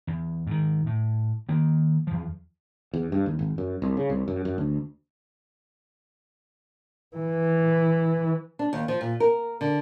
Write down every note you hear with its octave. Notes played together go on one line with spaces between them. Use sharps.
E2
G#2 D#3
A2
D#3 A#3
E2 F3
E2
G2
D#2
G#1
F#2
C2
C#3
C2
F#2
F#2
D2
E3
D4
D#2
F3
A#2
A#4
D3